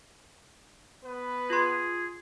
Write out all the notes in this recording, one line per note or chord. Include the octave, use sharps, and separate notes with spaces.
B3 B4
F4 G#4 C6